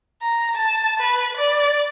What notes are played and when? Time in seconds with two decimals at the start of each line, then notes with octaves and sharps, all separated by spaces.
0.22 A#5
0.56 A5
1.00 B4
1.37 D5